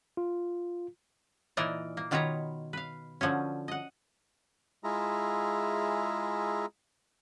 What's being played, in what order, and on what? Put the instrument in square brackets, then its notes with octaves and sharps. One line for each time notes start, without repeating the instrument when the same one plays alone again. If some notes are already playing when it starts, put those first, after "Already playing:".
[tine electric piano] F4
[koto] A#2 E3 D#4 A#4 D5
A#3
B2 D#3 F4 B4 C#5 A#5
B4 F5
D3 F3 F#3 C#4
D#5 F#5
[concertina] G#3 E4 F4 G#4 E5 A#5